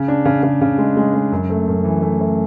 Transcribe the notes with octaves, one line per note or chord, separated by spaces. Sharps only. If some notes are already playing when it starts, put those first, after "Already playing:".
Already playing: C#3
D4
C#3
C#3
C#3
G#3
G#3
G#3
F#2
A3
F#2
E3
A3
A3